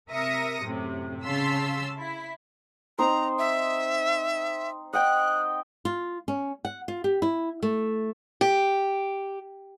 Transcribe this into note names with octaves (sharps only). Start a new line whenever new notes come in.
C3 A#4 E5 D#6 A#6 C#7
F#2 A2 C3
C#3 F5 A5 C6 E6 B6
E4 B6
C4 D#4 C5 A#5
E5
D#5 F#5 G5 F#6
F4
C#4
F#5
F4
G4
E4
A3
G4